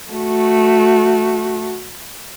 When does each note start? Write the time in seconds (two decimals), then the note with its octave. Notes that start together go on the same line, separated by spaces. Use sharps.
0.11 A3 F#4